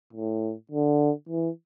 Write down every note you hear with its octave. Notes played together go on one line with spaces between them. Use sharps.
A2
D3
E3